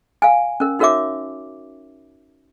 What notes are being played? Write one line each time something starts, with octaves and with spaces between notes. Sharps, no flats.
F5 G#5
C#4 A#4
D#4 F#4 A#4 C#5 E5 D6